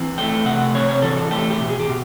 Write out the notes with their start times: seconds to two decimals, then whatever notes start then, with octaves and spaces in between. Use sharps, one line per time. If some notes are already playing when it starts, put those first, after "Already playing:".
Already playing: E3 C4
0.18 A3 G5
0.45 C3 F#5
0.75 C4 C#5
0.89 C#5
1.02 E3 A4
1.17 A4
1.31 A3 G4
1.50 G4
1.60 B2
1.69 G#4
1.80 G4
1.88 B2